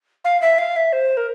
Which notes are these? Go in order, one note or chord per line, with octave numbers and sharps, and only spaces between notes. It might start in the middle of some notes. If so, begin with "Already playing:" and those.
F5
E5
F5
E5
C5
A#4